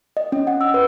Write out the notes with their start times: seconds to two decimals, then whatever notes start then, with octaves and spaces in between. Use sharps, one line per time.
0.17 D#5
0.32 C#4
0.47 F#5
0.61 E6
0.74 B4